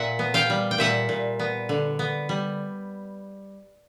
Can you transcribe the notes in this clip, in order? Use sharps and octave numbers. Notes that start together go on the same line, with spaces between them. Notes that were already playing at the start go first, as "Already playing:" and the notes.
Already playing: A#2 E5 F#5
B3
F5 G5
G3
G5
A#2 E5 F#5
A#2
B3
D3
B3
G3